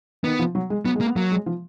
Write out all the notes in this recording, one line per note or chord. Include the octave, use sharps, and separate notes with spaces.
D#3 B3
F3
F#3
G#3
F#3 B3
G#3
A#3
B3
F#3 A#3
G#3
F3